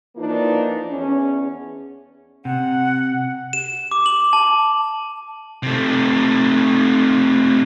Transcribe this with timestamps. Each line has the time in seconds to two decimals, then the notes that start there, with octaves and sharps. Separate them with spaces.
0.16 E3 F3 A#3 D4 D#4
0.89 E2 C#4
2.45 C3 F#5
3.53 E7
3.91 D6
4.06 F#7
4.33 A5
5.63 C3 A3